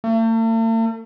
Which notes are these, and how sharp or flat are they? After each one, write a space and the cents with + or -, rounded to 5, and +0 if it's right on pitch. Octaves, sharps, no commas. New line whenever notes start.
A3 +45